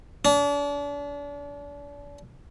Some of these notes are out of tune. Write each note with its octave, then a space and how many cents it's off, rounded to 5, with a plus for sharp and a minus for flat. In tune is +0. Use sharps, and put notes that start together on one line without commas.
D4 -40